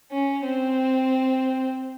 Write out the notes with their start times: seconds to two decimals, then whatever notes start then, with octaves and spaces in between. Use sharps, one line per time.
0.12 C#4
0.45 C4